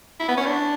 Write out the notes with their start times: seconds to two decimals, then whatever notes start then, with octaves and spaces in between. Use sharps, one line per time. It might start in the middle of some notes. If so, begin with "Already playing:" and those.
0.20 E4
0.28 B3
0.37 C#4
0.46 D4